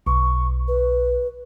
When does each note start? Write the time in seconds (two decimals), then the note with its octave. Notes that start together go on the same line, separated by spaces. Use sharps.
0.07 B1 C#6
0.68 B4